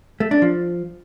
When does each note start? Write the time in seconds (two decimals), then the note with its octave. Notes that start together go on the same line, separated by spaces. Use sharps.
0.20 A3
0.31 D4
0.42 F3